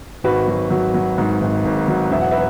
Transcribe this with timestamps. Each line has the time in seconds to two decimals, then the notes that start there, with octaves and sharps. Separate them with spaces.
0.24 G#1 F#4 B4
0.48 F#3
0.71 F#3
0.94 F#3
1.18 G#2
1.41 G#1
1.65 G#1
1.88 F#3
2.11 E1 E5
2.21 F#5
2.31 B4 E5